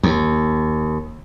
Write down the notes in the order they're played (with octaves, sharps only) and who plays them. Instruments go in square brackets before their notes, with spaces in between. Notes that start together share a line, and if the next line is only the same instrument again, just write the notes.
[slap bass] D#2